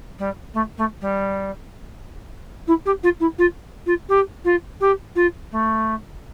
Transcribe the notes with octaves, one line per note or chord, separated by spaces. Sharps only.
G3
A3
A3
G3
E4
G4
F4
E4
F4
F4
G4
F4
G4
F4
A3